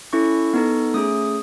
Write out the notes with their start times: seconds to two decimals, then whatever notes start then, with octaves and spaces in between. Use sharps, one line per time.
0.13 C#4 E4 A4 C#6
0.54 B3 D#4 A4
0.94 A3 C#4 G#4 D#6